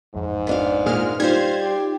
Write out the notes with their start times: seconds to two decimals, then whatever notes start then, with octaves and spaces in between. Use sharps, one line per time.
0.14 A1 F2 G#2
0.47 B3 D4 F5
0.86 A#2 G#3 G#4 F6
1.20 G3 D#4 F4 C5 F5 G#6
1.62 G4